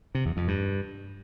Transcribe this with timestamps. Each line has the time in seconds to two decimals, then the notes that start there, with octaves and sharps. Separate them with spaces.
0.15 C3
0.26 E2
0.37 F2
0.48 G2